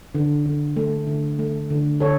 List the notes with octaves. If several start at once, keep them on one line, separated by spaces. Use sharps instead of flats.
D3
D3
A3
D3
A3
D3
D3 A4 C#5